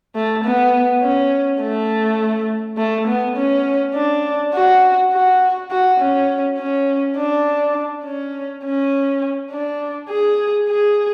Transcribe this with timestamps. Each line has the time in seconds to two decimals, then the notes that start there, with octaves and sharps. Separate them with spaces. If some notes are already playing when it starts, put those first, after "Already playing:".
0.15 A3
0.44 B3
1.02 C#4
1.61 A3
2.78 A3
3.07 B3
3.36 C#4
3.95 D4
4.54 F#4
5.13 F#4
5.70 F#4
6.00 C#4
6.58 C#4
7.17 D4
8.05 C#4
8.63 C#4
9.51 D4
10.10 G#4
10.69 G#4